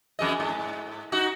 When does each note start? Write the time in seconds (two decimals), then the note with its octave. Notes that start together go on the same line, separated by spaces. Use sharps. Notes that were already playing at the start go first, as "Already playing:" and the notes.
0.19 F2 G#3 D#5
0.40 G#2
1.12 D#4 F#4